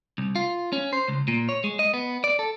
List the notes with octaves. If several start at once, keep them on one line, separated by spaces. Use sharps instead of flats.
C2
F4
C#4
C5
C#2
A#2
C#5
G#3
D#5
B3
D5
A4